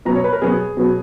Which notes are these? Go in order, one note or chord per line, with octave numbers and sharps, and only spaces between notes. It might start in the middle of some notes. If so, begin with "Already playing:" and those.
B2 F#3 B3 A#5
C#5
B4
A#4
B2 F#3 B3 G#4
B2 F#3 B3